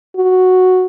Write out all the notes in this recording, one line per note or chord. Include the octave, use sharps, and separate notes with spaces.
F#4